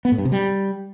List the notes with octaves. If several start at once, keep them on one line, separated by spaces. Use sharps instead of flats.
B3
A2
G2
C3
G3